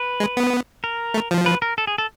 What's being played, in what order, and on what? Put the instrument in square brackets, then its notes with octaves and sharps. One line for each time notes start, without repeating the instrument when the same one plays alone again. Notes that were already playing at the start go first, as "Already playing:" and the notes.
Already playing: [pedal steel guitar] B4
[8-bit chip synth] G#3
B3
[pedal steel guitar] A#4
[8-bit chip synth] A3
F3
[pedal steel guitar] B4
A#4
A4
G#4
A4